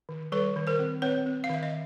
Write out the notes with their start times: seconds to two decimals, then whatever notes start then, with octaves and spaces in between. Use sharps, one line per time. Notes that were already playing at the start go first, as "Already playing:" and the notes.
0.09 D#3
0.32 G3 A4 B4
0.56 D#3
0.67 A#4 C5
0.79 C4
1.02 C4 B4 C#5
1.26 C4
1.44 F5
1.49 D#3 E5
1.63 D#5